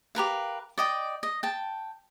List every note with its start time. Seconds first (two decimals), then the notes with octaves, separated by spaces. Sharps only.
0.15 G4 A#4 B4 F5
0.78 D5 D#5 G5
1.23 D#5
1.43 G5 A5